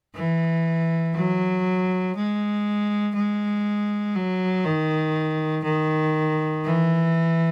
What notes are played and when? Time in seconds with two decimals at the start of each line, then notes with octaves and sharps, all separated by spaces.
0.15 E3
1.15 F#3
2.15 G#3
3.15 G#3
4.15 F#3
4.64 D#3
5.64 D#3
6.64 E3